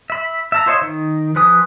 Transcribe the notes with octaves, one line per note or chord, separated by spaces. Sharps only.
E5 B5
E5 A5 A#5
F4 C5 C#5 D#5 E5
D#3
F3 B4 G#5 D#6